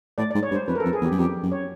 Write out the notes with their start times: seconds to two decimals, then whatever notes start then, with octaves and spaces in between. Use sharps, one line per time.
0.17 A2 D5
0.31 G#2 D5
0.43 C#5
0.51 G2
0.55 C5
0.68 F2 B4
0.75 A#4
0.80 F2 A4
0.93 G#4
1.01 E2
1.06 G4
1.11 F#2
1.18 F2 G4
1.43 F#2
1.52 C#5